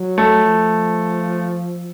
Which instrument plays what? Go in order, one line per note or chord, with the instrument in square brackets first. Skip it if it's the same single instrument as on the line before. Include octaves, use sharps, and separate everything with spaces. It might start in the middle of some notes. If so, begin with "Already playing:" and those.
Already playing: [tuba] F#3
[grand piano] A3
[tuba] F3